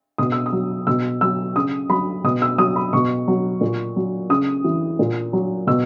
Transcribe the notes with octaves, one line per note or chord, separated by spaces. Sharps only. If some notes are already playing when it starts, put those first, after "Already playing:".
B2 D#6
E6
D#6
F#3
B2 E6
F#3 E6
C#3 D#6
F#3 B5
B2 D#6
E6
F#3 D#6
B5
B2 C#6
F#3
A#2
F#3
C#3 D#6
E3
A#2
F#3
B2 E6